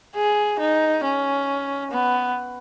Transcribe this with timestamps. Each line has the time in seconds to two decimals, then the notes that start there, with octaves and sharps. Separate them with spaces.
0.16 G#4
0.59 D#4
1.04 C#4
1.91 B3